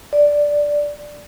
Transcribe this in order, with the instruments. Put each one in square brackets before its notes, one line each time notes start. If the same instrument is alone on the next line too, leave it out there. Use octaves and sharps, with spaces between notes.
[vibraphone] D5